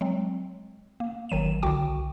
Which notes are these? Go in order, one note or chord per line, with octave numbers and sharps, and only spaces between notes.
F#3 G#3 C4
A#3
G#1 D#3 F#3 D#7 E7
C2 D3 F#4 G5 D6